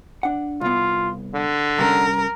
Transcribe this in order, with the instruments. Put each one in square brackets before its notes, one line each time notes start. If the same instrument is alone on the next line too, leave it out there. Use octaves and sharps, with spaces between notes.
[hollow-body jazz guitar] D4 F#5
[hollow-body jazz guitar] C2 B3 [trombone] F4
[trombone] D3
[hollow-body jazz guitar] C3 G3 C#4 [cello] A#4